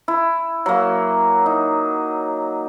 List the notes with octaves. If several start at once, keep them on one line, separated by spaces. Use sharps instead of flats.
E4
F#3 A#3
D#4